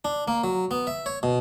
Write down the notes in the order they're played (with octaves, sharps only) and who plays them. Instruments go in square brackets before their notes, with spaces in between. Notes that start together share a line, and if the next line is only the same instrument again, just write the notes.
[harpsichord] D4
A#3
F#3
B3
E5
C#5
B2